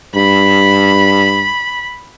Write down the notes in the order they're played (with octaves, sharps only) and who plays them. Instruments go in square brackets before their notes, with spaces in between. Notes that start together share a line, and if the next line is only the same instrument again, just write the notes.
[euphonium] G2 [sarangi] B5